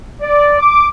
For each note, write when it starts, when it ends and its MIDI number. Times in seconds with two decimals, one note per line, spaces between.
0.21 0.56 74
0.58 0.87 86